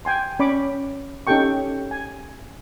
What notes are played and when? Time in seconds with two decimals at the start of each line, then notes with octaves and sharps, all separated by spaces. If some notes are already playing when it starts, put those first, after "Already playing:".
0.05 G5 G#5 C6
0.39 C#4 D5 B5 C#6 D6
1.27 C#4 D#4 G4 A4 G5 C#6
1.91 G#5